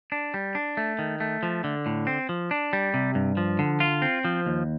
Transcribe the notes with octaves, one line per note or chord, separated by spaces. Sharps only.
D4
G3
D4
A3
D#3
A3
F3
D3
A2
C4
F3
D4
G3
C3
G2
F3
D3
F4
C4
F3
D#2